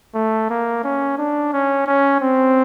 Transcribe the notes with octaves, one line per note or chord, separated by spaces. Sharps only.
A3
A#3
C#4
D4
C#4
C#4
C4